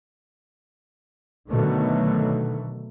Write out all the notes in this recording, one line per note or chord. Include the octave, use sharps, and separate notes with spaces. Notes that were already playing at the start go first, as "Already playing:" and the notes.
B2 D3 D#3 F#3 A3